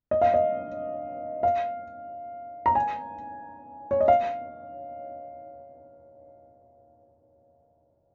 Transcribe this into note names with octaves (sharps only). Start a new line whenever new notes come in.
D#5
F5
D#5
F5
A#5
G#5
C#5
D#5
F5